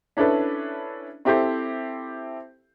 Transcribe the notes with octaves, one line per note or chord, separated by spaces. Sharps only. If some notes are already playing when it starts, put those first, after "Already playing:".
C#4 D4 E4 A4 B4
C4 E4 G4 A4 C5